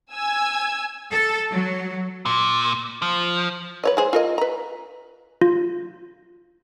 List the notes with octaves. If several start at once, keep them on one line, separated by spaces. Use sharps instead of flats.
G#5 E6 G#6
A4
F#3
A#2
F3
B4 C#5 D#5
G#3 G#4 C5
F4 A#4 D#5
B4 A#5
F4